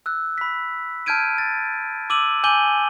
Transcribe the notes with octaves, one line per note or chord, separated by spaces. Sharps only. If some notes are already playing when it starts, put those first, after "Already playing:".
E6 F#6
B5 B6
A5 F6 G6 G#6 D7 D#7
A6
D6 E6 D#7 F#7
G#5 D6 G6 D#7 F#7 G7